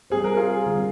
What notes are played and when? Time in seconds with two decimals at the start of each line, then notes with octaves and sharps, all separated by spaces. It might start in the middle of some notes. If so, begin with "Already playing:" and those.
0.10 G3 C4 F4 G#4 C5
0.24 A#4
0.37 F4 G#4
0.66 D3 G3 C4